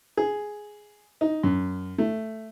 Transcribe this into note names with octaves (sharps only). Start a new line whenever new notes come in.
G#4
D#4
F#2
A3